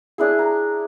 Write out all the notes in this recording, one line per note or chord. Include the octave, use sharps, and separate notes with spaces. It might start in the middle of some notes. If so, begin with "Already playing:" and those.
D4 E4 G#4
A#5